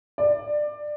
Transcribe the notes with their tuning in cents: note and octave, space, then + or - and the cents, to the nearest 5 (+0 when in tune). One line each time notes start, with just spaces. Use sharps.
D5 +20